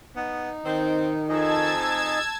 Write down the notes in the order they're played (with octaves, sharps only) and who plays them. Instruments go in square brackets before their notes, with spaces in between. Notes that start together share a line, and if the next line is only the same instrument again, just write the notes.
[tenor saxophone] B3 [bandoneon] D#4
[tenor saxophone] D#3 [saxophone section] C4
[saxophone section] F2 [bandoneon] D#4 G#4 D#5 [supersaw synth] A5 E6 G#6